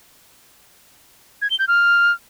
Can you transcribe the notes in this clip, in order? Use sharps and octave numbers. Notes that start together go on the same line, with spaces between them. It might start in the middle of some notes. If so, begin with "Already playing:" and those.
G#6
G7
G6
F6